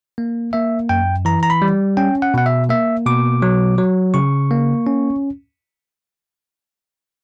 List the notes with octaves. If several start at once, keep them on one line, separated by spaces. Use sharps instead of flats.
A#3
A#3 E5
F#2 G5
E3 A#5
A#5
B5
G3
C#4 G5
F#5
B2 F#5
E5
A#3 E5
B2 D6
F#3
F#3
C#3 C#6
A#3
C#4